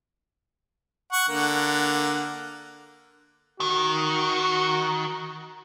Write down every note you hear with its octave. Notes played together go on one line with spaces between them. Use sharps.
F#5 C#6
D3 A#3 F#5
D#3 F#4